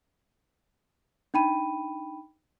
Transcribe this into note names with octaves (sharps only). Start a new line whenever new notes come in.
D4 D#4 G5 B5 D#7